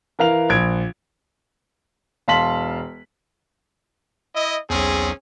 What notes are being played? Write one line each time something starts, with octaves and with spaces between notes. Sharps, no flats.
E3 A#4 F5 F7
A#1 G#6 D7
E1 F5 A5 C6 B6 F#7
E4 D#5
B1 E2 C4 C#4 G#4